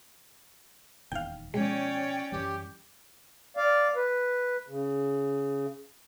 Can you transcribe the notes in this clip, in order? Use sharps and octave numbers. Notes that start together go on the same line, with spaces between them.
D#1 E2 D#3 F5 G5
B2 F3 G#3 C#4 C#5 D5 G5
F#2 E3 G3 G4
D5 F5
B4
C#3